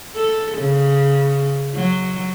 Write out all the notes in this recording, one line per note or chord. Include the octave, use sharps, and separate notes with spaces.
A4
C#3
F#3